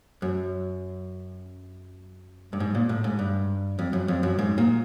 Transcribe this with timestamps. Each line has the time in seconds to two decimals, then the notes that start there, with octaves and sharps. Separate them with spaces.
0.22 F#2
2.53 G2
2.60 G#2
2.75 A#2
2.89 A2
3.04 G#2
3.19 G2
3.79 F2
3.93 F#2
4.08 F2
4.23 F#2
4.39 G#2
4.58 A#2